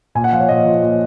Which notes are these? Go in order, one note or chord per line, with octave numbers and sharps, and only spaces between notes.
A#2 G#5
F#5
F3 F5
C#5
A#2 D#5
F3
A#2